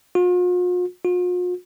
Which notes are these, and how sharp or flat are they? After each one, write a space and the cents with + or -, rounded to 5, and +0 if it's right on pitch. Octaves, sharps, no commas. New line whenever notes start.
F4 +45
F4 +45